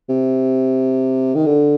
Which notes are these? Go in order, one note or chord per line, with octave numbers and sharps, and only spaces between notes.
C3
D#3
D3